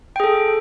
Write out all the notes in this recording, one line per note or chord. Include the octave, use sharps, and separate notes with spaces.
G#4 A4 G5